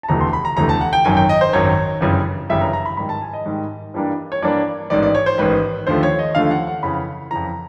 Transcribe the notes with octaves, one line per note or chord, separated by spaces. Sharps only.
A5
E1 D2 C3 E3 A3 A#5
C6
B5
A#5
E1 D2 C3 E3 A3 A#5
A5
F#5
G5
G#1 F#2 D#3 F#3 G#5
G5
D#5
C5
G#1 F#2 D#3 F#3 C#5
G1 F#2 C#3 E3 G3
G1 F#2 C#3 E3 G3 E5
A#5
A#5
B5
G#2 D#3 G3 B5
A5
G#5
D#5
G#2 D#3 G3
G2 E3 G3 A#3 D4
C#5
G2 E3 G3 A#3 D4 D5
A1 G#2 D#3 D5
D5
C#5
C5
A1 G#2 D#3 B4
D#2 D3 F3 A3 C5
C#5
D#5
D#2 D3 F3 A3 F5
F#5
F#5
F2 C#3 E3 B5
F2 C#3 E3 A#5